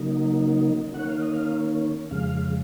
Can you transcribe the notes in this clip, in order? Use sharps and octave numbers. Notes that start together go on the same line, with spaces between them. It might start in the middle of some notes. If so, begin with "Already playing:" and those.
Already playing: C#3 F#3 A#3 D#4
D#3 A#3 C#4 F#5
F5
D#5
F5
F2 C#3 G#3 F5